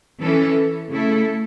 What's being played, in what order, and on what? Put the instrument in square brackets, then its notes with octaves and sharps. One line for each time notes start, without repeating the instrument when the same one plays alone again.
[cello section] E3 C#4 A4
C#3 A3 E4 A4